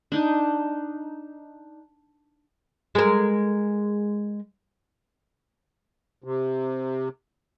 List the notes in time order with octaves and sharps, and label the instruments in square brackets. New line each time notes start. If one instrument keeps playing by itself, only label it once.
[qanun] D4 D#4
[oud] G#3 A#4
[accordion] C3